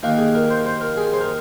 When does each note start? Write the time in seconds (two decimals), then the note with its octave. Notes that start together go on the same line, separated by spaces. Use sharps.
0.03 D#2 D#3 A#3
0.18 G#4
0.35 A#4
0.50 C5
0.65 C5
0.81 A#4
0.97 G#4
1.13 C5
1.20 A#4